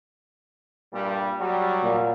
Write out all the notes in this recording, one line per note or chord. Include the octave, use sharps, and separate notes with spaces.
G2 A#2 G3
F#3 G3
A#2